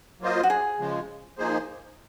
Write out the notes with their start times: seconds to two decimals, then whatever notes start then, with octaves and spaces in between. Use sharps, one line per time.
0.21 F#3 A#3 F4 C5 D#5
0.43 F#4
0.50 G#4
0.79 C#3 F3 G#3
1.38 F3 A#3 D#4 G#4 C5